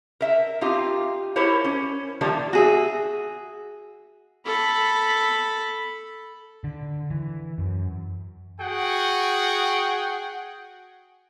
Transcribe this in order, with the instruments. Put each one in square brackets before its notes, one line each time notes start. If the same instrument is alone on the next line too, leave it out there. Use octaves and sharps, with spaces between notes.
[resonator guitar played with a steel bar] A#4 E5
C4 D#4 F4 G4
E4 G4 A#4 C5 C#5
C#4
D#3 F3 G3 A3 A#3 D4
[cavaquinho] F#4 G#4 E5
[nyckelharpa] A4 B5
[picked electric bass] D3
E3
F#2
[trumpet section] F#4 G#4 F#5 G5